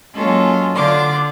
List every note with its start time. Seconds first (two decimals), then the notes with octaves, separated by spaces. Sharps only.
0.15 F#3 G#3 A#3 C#4 F4 A4
0.75 D3 D4 F4 D6